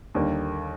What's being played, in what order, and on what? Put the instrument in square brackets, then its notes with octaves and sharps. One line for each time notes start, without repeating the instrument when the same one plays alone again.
[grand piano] D#2 D3 G3 A#3